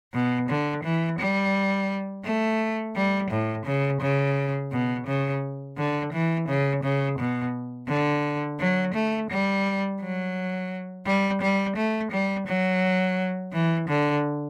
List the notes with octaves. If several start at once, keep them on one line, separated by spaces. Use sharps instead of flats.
B2
D3
E3
G3
A3
G3
A2
C#3
C#3
B2
C#3
D3
E3
C#3
C#3
B2
D3
F#3
A3
G3
F#3
G3
G3
A3
G3
F#3
E3
D3